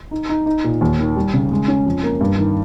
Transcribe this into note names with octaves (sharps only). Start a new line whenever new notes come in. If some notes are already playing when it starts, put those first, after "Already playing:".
D#4
D#4
D#4
A#2
D#2
D#3
G3
C#3
G#3
C#4
F2
A#3
G2
D#3